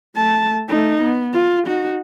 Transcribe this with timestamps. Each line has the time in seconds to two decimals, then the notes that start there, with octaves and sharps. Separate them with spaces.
0.16 A3 A5
0.68 A3 D#4
1.02 B3
1.33 F4
1.67 D#4 F#4